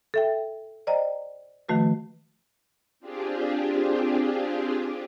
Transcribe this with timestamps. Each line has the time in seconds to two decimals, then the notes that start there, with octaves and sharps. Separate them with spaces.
0.14 A4 E5 G5
0.87 C5 D5 D#5 G5 A#5
1.69 D#3 F3 A3 F#4 B4
3.00 C4 D4 F4 G4 G#4